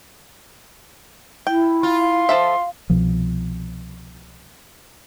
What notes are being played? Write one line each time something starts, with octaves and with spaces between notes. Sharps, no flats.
E4 G5
F4 C6
F3 A4 E5
C2 B2 F3